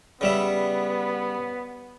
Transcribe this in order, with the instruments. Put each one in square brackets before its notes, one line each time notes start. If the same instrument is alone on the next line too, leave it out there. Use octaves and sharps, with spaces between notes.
[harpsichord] C#3 G3 E5 [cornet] B3